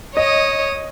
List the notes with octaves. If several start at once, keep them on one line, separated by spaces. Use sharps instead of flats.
C#5 D#5 D#6